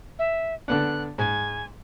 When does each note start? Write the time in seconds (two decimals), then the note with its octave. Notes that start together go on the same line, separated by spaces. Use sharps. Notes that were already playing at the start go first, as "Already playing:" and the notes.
0.19 E5
0.68 D3 B3 D4 F#6
1.18 G#2 G#5